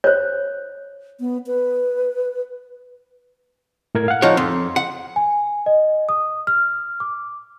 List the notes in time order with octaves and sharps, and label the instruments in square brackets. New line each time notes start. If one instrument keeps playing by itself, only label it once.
[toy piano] C5 C#5
[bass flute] B3
B4
[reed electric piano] A2 A#4 G#6
F5 F#5
[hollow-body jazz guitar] F3 D#4 C#5
[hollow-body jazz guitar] F2 [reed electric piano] C6
[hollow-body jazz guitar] F#5
[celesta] G#5
D#5
D#6
F6
D6